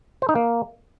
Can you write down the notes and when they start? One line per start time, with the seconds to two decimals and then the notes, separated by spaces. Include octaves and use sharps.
0.22 C5
0.29 D#4
0.35 A#3